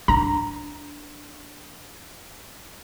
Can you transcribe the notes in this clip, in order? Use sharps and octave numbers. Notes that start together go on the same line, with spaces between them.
D4 A#5